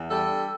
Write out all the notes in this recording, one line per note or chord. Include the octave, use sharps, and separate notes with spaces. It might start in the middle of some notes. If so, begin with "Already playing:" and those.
Already playing: E2
G3 A4
D4